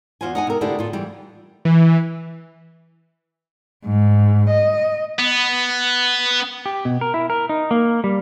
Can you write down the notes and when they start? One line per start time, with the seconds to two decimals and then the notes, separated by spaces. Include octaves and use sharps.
0.21 E2 F4 F#4 C5 G#5
0.35 D#4 F#5 G#5
0.47 C3 A#4
0.61 D3 A3 E4 F4 G4 G#4
0.79 A2 F4
0.93 E3 G3
1.65 E3
3.85 G#2
4.50 D#5
5.19 B3
6.66 G4
6.85 B2
7.01 A#4
7.14 E4
7.30 A#4
7.49 D#4
7.71 A#3
8.04 G3